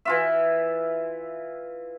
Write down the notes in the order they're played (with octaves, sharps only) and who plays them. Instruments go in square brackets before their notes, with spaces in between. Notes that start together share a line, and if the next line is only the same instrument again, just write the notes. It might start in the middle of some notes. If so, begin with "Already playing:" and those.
[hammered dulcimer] E3 F4 E5